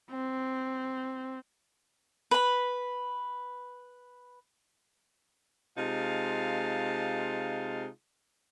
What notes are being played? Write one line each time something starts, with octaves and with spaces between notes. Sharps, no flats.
C4
B4 B5
C3 G#3 D#4 F4 F5 A5